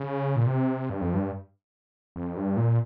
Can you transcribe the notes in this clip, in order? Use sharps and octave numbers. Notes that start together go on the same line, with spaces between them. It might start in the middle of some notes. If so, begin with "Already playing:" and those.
Already playing: C#3
A#2
C3
G2
F2
G2
F2
G2
A#2